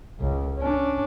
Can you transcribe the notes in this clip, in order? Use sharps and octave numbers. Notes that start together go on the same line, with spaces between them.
C#2
C#4 D4